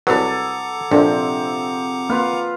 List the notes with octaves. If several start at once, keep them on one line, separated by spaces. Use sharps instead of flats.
C2 F#3 G#4 A4 B4 F#5 A#5 D6
A#1 C3 F3 C4 D4 A4
A#3 F4 B4 F5